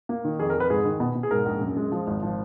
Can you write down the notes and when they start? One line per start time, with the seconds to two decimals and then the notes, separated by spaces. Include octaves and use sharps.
0.09 A#3
0.24 D#3
0.39 F2 G#4
0.50 A#4
0.55 F2
0.60 B4
0.70 G#2 G#4
0.85 D#3
1.00 B2
1.15 B2
1.23 G#4
1.31 G#2 A#4
1.46 A#1
1.61 F#2
1.76 G#3
1.92 F3
2.07 G#1
2.22 F3